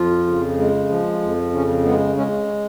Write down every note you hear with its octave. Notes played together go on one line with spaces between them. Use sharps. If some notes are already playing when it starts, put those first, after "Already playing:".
Already playing: F2 F3 F4
C#3
G#3
F3
F2
C#3 C#4
G#3 B3
G#3 C#4